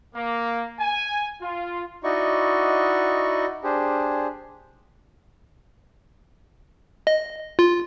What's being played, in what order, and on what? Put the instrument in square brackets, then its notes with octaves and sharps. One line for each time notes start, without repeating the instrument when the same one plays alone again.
[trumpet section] A#3
G#5
F4
[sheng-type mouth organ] D#4 E4 F#4 D5 D#5 C#6
D4 G4 G#4 C5
[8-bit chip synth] D#5
F4